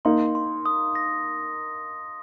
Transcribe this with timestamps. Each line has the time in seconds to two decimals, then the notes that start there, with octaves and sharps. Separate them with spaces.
0.05 A#3 D#4 C6
0.35 C6
0.66 D#6
0.95 A#6